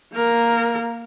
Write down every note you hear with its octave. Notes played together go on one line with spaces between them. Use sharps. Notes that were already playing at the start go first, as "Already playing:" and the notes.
A#3 A#4